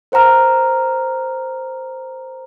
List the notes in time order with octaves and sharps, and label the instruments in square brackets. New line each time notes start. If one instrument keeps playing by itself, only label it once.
[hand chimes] A#4 C5 F#5 A#5 F6